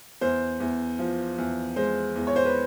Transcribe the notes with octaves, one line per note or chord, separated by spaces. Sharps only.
E2 C5
E2
F3
E2
G#3 C5
E2
C#5
C5
B4